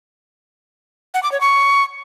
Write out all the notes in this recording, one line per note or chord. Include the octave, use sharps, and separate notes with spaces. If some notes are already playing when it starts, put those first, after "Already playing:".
F#5
D6
C#5
C#6